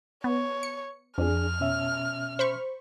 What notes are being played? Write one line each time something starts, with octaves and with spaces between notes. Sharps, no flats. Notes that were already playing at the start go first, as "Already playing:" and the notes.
B3 C#5
C#7
F2 D4 G#4 F6
B2 C#4 E5
C5 B5 C#6